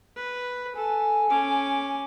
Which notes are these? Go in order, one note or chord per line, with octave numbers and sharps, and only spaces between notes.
B4
A4 G#5
C#4 D6